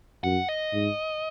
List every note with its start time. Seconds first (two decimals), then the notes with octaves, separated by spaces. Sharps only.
0.24 F#2 F#5
0.48 D#5
0.73 G#2